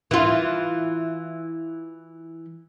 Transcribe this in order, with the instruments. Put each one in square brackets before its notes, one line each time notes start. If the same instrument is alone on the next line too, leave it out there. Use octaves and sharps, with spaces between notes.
[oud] E3 F4